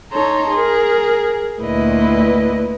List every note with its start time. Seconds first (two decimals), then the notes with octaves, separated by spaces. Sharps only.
0.11 D#4 A4 C#5 A#5 C6
0.51 G#4 A#4
1.60 D2 A#2 E4 B4 D#5